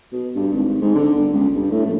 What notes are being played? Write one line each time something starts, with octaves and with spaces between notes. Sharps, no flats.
B2
G2
G#1
G#2
D3
G1
C#2
G2
A2
A#1